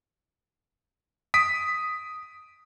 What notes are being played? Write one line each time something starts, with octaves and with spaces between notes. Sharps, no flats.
D#6 B6 D7